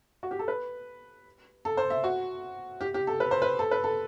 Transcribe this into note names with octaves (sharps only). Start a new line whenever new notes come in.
F#4
G4
A4
B4
A4
C5
E5
F#4
G4
G4
A4
B4
C5
B4
A4
B4
A4